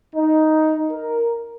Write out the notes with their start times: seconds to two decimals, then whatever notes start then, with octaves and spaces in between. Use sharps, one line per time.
0.15 D#4
0.91 A#4